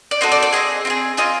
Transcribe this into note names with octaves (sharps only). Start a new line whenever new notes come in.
D5
C4 D#4 F#4 A4 D#5
D5
D5
C4 F4 G#4 D#5
C4 F4 G#4
C4 F4 G#4 D#5